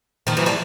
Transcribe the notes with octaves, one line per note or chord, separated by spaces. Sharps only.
D#3 F3
E3 F#3
F3 G3